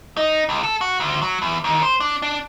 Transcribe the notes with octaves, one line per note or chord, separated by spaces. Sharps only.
D#4
C#2
A4
F#4
D2
F#3
E2
D#2
C5
D4
D4